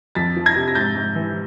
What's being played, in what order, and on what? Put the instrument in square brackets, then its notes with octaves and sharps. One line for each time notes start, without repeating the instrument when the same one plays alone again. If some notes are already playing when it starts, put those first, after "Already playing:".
[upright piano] F2 A6 B6
F3
G#6 A#6
C3
A#6
G#2 G6 A6
G#2
E3